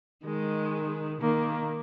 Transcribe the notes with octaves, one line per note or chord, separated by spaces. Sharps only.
D#3 G#3
D#3 A#3